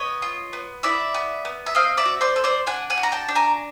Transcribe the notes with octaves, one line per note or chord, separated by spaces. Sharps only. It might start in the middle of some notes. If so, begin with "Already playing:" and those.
Already playing: B3 C#5 D#5
F4
B3
E4 D5 E5
B3
B3
E5
C4 D#5 F5
D5 E5
F#4
C5 D5
A4
C5 D5
D4 F#5 G#5
F#5 G#5
F#4
A#5
G5 A5
D4
G#5 A#5